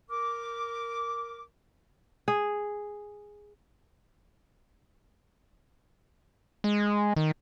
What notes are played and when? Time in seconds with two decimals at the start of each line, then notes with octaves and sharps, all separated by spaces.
0.10 A#4 D6
2.28 G#4
6.64 G#3
7.16 D#3